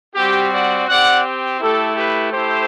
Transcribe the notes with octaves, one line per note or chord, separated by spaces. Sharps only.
G3 C4 F#4 G4
D5 F#5
C4 G4 D5 F#5
A3 E4 G4 A4
G4 B4
A3 E4 G4 A4 C5